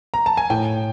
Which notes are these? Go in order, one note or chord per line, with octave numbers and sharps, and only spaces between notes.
A#5
A5
G#5
A2 G5